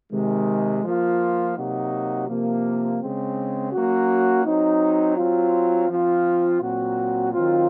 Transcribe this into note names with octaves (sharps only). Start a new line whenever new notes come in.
C3 D#3 G#3
F3 A#3 F4
C3 F#3 A#3 D#4 F#4
C3 F3 A#3
C#3 G#3 C4
F#3 A#3 C#4 F#4
F#3 C4 D#4
F#3 C4 F4
F3 C4 F4
A#2 F#3 C4 F#4
D#3 F#3 C4 F4